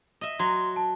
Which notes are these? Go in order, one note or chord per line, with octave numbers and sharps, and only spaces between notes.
D#5 E5
F#3 C6
A5